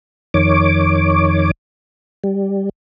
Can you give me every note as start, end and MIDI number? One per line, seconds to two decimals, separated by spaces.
0.34 1.51 41
0.34 1.51 51
0.34 1.51 73
0.34 1.51 86
2.24 2.69 55